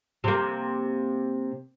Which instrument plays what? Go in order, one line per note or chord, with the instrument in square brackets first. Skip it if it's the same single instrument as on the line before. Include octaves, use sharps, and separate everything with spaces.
[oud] C3 A#3